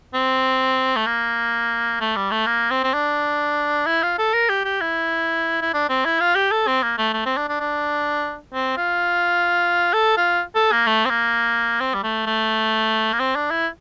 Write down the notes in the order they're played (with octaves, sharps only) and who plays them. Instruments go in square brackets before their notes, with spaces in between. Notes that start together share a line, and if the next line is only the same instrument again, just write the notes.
[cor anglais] C4
A3
A#3
A3
G3
A3
A#3
C4
C4
D4
E4
F4
A4
A#4
G4
G4
E4
E4
D4
C4
E4
F4
G4
A4
C4
A#3
A3
A3
C4
D4
D4
D4
C4
F4
A4
F4
A4
A#3
A3
C4
A#3
C4
G3
A3
A3
A#3
C4
D4
E4